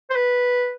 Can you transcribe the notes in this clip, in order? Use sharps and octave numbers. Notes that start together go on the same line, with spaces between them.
C5
B4